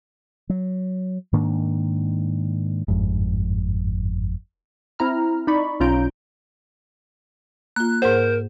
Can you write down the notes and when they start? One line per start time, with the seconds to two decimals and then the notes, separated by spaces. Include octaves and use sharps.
0.50 F#3
1.33 G#2 D#3 A#3 D4
2.88 G1 F2 G#2
4.99 C4 E4 A#5 F6
5.47 D#4 D5 B5 C#6
5.80 B1 C#4 F4 A#5 G6 D7
7.76 A#3 F4 F#6
8.02 G#2 A#4 C5 F#5